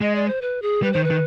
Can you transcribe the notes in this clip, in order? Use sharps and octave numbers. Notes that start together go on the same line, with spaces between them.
G#3 D#5
D5
C5
B4
G#4
G3 B4
D#3 C5
B4
D#3